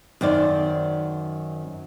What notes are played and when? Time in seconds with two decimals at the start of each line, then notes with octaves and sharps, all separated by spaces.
0.21 F#2 D#3 C5 D5